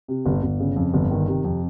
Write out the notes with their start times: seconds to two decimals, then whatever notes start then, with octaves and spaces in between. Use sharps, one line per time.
0.08 C3
0.26 G1
0.43 G1
0.60 C#3
0.76 F2
0.94 G1
1.11 D#3
1.27 C3
1.44 F2